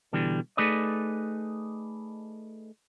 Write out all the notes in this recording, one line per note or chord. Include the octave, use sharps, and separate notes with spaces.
B2 D3 E3 G3
A3 D#4 G#4 B4 D5 D#5